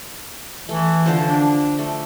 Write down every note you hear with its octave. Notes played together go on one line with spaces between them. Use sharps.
E3 A3
D3 F3 C5
D4
A3